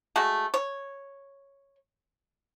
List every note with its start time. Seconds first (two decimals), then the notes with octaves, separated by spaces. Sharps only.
0.16 G#3 A3 F#4
0.54 C#5